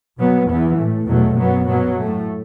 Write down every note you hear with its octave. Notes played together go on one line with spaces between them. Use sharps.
B2 F#3 B3
E2 E3 B3
A2 A3
E2 B2 F#3 A3
F#2 F#3 B3
B2 F#3 B3
A2 A3